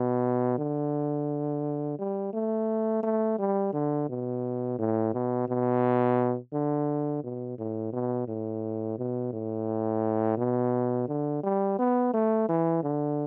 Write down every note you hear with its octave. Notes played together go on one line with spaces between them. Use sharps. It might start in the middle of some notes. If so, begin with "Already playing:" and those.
Already playing: B2
D3
G3
A3
A3
G3
D3
B2
A2
B2
B2
D3
B2
A2
B2
A2
B2
A2
B2
D3
G3
B3
A3
E3
D3